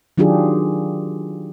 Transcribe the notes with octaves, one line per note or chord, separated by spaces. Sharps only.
D#3 F#3 D4 F4 G4 G#4